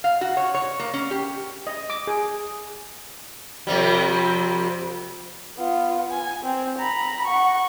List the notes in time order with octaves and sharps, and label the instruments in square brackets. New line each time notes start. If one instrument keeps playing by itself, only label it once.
[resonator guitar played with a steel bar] F5
F#4
C#5
C#5
A#3
C#4
G4
[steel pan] D#5
D6
G#4
[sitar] F2 C3 G3
[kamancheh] B3 F4
G#5
C4
A#5 B5
F#5 C#6